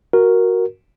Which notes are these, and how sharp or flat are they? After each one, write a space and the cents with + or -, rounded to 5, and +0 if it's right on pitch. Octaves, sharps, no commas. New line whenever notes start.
F#4 +0 A#4 +0